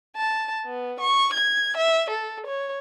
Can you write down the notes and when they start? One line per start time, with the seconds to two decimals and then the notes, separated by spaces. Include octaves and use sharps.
0.16 A5
0.65 B3
1.00 C#6
1.33 G#6
1.77 E5
2.10 A4
2.46 C#5